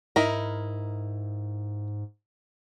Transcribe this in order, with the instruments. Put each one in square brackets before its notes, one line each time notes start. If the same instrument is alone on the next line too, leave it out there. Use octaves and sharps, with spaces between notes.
[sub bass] G#2 [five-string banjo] D#4 E4 A#4